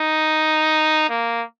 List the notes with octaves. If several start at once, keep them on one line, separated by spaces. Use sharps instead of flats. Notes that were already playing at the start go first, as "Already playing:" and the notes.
Already playing: D#4
A#3